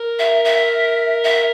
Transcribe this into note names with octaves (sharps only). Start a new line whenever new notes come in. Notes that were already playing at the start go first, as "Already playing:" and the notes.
Already playing: A#4
E5
E5
E5